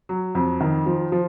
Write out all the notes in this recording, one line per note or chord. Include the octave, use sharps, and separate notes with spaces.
F#3
F2
D#3
F3
F3